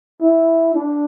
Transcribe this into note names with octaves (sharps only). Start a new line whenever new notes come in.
E4
D4